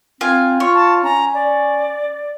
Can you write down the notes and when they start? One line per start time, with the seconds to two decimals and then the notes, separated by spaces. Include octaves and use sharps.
0.21 C4 F4 G#5
0.60 F4 C#5
0.75 A5
1.03 C#4 A#5
1.34 D5